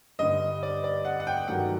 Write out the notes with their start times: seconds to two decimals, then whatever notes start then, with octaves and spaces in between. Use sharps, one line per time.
0.19 G2 D3 G3 D#5
0.63 D5
0.84 D5
1.05 F#5
1.20 F#5
1.27 G5
1.48 G2 D#3 F#3 A3 F#5